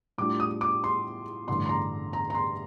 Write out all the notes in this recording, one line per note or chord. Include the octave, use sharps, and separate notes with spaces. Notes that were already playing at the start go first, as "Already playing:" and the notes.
A2 G3 D4 F4 D6
D#6
D6
C6
A1 G2 D3 A3 C6
C6
A#5
A#5
A#5
C6